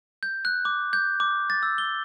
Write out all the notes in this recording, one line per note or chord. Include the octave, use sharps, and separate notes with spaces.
G6
F#6
D6
G6
D6
A6
E6
G7